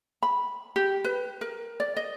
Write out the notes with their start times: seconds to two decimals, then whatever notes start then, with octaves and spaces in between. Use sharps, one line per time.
0.22 B5
0.76 G4
1.04 B4
1.41 A#4
1.80 D5
1.96 D#5